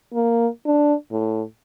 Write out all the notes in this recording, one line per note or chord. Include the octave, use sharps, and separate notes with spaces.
A#3
D4
A2